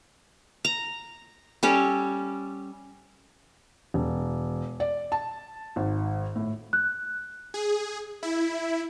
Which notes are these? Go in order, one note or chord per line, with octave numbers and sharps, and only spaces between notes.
A#5
G3 C#4 A4
E1
D5
A5
G#1
A2
F#6
G#4
E4